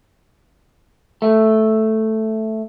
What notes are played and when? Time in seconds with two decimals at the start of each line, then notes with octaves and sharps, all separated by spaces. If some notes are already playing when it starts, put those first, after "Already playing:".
1.22 A3